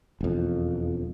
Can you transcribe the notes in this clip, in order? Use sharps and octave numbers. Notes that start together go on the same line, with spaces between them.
E1 F2